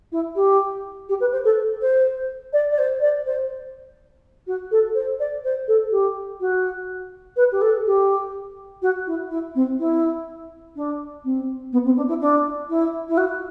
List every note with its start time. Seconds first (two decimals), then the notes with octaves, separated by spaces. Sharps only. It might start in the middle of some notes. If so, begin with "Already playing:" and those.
0.12 E4
0.36 G4
1.09 G4
1.20 B4
1.32 C5
1.44 A4
1.81 C5
2.53 D5
2.71 D5
2.78 C5
3.01 D5
3.26 C5
4.47 F#4
4.71 A4
4.95 C5
5.19 D5
5.44 C5
5.68 A4
5.91 G4
6.40 F#4
7.36 B4
7.52 G4
7.61 A4
7.86 G4
8.82 F#4
9.07 E4
9.30 E4
9.55 C4
9.79 E4
10.76 D4
11.24 C4
11.72 B3
11.85 C4
11.96 D4
12.08 E4
12.20 D4
12.69 E4
13.09 E4
13.17 F#4